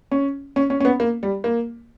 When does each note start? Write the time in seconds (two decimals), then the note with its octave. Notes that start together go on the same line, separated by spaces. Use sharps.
0.11 C#4
0.56 C#4
0.70 C#4
0.80 C#4
0.85 B3
1.00 A#3
1.23 G3
1.44 A#3